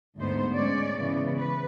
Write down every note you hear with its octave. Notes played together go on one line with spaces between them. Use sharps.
D2 G#2 B3 C5
G#3 C#4 C#5 D5
C#3 E3 B3
B4